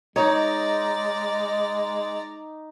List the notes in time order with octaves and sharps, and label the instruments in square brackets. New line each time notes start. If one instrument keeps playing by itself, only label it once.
[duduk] G#3 [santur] D#4 [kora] C#5 [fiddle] D5 A#5